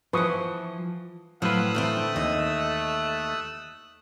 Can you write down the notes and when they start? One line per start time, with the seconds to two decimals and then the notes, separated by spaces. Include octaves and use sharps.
0.13 E3 F3 B4 C#6 D#6
1.42 A2 F#3 C4 B4 F5 D#6 E6 F#6
1.74 D3 E3 A3 C4
2.16 D#2 D#5